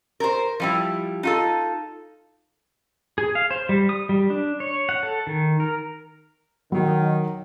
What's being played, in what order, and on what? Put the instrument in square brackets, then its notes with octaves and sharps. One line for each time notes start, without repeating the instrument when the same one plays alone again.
[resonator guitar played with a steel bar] A#4 C5
F3 G3 E4
D#4 F4 A4
[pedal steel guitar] G#4
F5
C5
G3
D#6
G3
D4
C#5
F#5
A4
D#3
A#4
[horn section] D#3 [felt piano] F#3